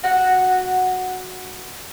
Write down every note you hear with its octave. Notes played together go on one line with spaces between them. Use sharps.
F#4 F#5